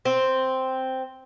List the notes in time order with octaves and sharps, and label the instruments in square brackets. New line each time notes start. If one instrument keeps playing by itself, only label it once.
[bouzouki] C4